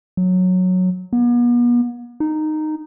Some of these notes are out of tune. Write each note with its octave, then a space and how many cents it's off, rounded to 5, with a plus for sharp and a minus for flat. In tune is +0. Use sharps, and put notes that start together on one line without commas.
F#3 -10
B3 -40
D#4 -10